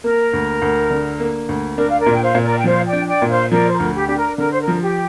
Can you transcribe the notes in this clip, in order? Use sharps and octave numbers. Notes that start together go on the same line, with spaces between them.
A#3 A#4
D2
D2
D3
A#3
D2
D4 A#4
F5
A#4 D5
A#2
G5
C5 F5
A#2
A#4 D5
G5
F3 C5 F5
D5 G5
D4
D5 G5
A#2
C5 F5
F3 A#4 D5
C5
A#4
D2
G4
D4 G4
A#4
D3 A#4
C5
A#4
F3
G4